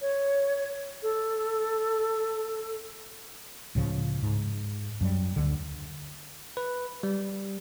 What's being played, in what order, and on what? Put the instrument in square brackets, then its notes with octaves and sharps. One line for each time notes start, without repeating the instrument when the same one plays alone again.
[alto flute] C#5
A4
[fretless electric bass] C#2 A2 C#3 F3
G#2
F#2 F#3 G3
D2 D3
[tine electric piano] B4
G3